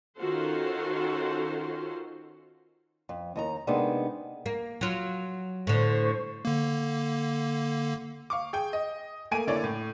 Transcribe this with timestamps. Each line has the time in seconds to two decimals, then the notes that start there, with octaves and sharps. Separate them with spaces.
0.17 D#3 C#4 F4 F#4 A4 C5
3.09 F2
3.36 D#2 D#4 A#5
3.67 C3 G#3 A#3 B3 D4 D#4
4.46 A#3
4.81 F#3 F4
5.67 A2 D3 C5 C#6
6.45 D3 A#3
8.30 F5 C#6 D6
8.53 G#4 G5
8.73 D#5
9.31 A3 A#3 G#5 D7 D#7
9.47 D3 A#3 E4 C#5 D5
9.64 A2